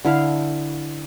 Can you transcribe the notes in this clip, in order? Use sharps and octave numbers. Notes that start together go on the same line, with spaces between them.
D3 E4 F5